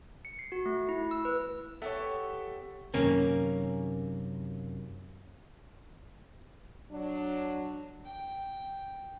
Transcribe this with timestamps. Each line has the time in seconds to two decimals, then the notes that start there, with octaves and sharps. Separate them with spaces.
0.25 C#7
0.39 C7
0.52 F#4
0.66 A3
0.89 E4
1.11 E6
1.25 B4
1.82 B3 G4 A4 C#5 E5
2.94 F#2 C3 D#3 A#3 C#4
6.92 F#3 D4
8.06 G5